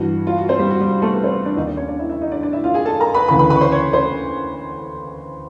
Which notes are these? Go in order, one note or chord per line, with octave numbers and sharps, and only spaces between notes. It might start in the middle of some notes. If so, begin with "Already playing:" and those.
Already playing: G2 E3 F#4
F4
F#4
C4 C5
G3 G4
F#4
G3 G4
A3 A4
B3 B4
C4 C5
D4 D5
D#2 D#3 D#4 D#5
D4 D5
C#4 C#5
D4 D5
E4 E5
E4 E5
D#4 D#5
D4 D5
D4 D5
E4 E5
F4 F5
G#4 G#5
A4 A5
A#4 A#5
B4 B5
D2 C#3 E3 B4 B5
B4 B5
B4 B5
C#6
C5 C6
C#5 C#6
C5 C6